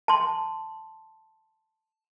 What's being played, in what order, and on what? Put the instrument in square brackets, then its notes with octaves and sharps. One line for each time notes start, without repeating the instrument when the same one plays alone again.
[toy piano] A5 C6